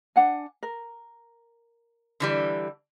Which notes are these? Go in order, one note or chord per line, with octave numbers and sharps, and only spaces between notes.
D4 F#5 G#5
A#4
D3 E3 G3